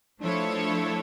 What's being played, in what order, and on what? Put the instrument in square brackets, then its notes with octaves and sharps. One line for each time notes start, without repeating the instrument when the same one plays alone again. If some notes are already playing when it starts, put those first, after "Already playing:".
[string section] F3 A3 E4 A4 C#5 [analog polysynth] D4
[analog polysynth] D4